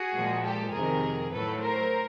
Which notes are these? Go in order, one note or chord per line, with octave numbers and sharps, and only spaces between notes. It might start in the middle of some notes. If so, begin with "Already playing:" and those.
Already playing: F#4 G#4
A#2 F3 G#3
G4 A4
F2 C3 D#3 G#4 A#4
A2 F#3 A3 A4 B4
A#4 C5